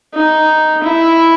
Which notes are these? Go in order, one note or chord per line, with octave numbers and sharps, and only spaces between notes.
D#4
E4